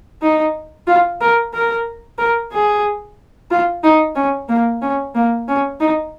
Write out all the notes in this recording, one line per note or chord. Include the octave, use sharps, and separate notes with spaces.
D#4
F4
A#4
A#4
A#4
G#4
F4
D#4
C#4
A#3
C#4
A#3
C#4
D#4